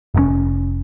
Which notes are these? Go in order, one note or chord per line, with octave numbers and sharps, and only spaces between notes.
F1 G#2 C#4